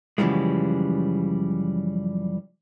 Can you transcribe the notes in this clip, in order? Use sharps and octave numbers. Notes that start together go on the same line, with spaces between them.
F#2 C#3 E3 F3 G3 G#3